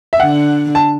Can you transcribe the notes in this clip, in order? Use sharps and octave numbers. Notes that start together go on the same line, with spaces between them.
E5
D3 D4 F#5
A5